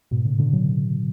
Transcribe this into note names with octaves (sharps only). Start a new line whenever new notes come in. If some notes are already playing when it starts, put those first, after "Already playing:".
G#2 B2
A2 C#3
B2 D3
D3 F#3